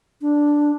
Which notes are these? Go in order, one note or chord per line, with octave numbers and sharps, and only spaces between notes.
D4